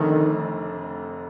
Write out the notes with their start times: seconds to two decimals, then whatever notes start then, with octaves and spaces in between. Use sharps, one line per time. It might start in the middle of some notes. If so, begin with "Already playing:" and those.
Already playing: F1 F2 D3 D#3 A3 D4